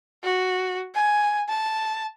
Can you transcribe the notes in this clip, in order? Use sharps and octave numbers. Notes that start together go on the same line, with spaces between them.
F#4
G#5
A5